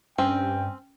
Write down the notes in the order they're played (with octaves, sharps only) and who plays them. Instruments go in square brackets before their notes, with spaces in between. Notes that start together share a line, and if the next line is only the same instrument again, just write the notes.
[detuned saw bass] G2 [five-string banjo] C4 [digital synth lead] C#4 [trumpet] G5